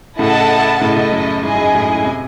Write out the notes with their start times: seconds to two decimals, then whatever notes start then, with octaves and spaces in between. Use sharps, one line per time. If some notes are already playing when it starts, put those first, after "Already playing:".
0.19 A2 C#3 E4 A4 D#5 F#5 A5
0.81 A2 C#3 E4 A4 D#5
0.96 A2 C#3
1.12 F#2
1.43 G#2 E4 G#4 D#5 G#5
1.54 F#2
1.59 G#2
1.74 F#2 A2
2.05 C3